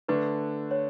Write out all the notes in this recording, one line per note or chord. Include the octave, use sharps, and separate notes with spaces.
D3 A3 D4 B4
C#5